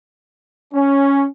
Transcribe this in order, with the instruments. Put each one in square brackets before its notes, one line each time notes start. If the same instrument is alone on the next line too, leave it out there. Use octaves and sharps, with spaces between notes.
[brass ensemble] C#4